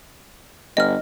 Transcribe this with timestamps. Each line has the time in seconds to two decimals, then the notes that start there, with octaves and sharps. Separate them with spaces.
0.77 G1 D#5 F6